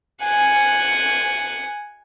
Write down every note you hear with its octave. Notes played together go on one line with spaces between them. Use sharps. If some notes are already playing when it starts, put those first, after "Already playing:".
F#5 G#5